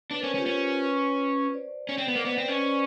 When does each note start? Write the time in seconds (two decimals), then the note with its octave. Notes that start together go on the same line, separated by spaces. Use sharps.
0.11 D4 B4 C#5
0.20 A#4 C5
0.23 C#4
0.29 B4 C#5
0.35 C#4
0.37 F4 G4
0.46 C#4
0.82 B4 C#5
1.53 C5 D5
1.89 C#4
1.98 C4
2.08 B3
2.16 A#3
2.20 D#5
2.25 B3 C5 D5
2.38 C4
2.43 B4 C#5
2.48 C#4
2.61 C5 D5